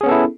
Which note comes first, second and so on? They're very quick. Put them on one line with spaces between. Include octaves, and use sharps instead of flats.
G#4 C#4 B3 A4 E4